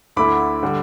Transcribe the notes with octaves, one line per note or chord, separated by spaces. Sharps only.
D2 D3 A3 E4 B5 D6
D3 G3